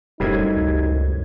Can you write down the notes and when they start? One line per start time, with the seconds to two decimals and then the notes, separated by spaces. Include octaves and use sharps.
0.20 E1 F#2 A2 C3 G3 D#4 G#6
0.56 C#2